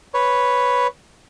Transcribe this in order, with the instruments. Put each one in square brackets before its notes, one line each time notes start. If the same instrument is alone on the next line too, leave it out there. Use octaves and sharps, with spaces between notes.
[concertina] B4 C#5